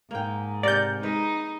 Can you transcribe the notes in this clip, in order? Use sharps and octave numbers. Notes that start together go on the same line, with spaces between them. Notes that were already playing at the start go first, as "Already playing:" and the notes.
G#2 A#3 G5
C3 A#4 D5 F#5 G6
G#3 D#4 B4